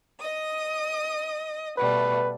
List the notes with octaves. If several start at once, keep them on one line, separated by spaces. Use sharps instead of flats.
D#5 D#6
B2 G3 A3 B4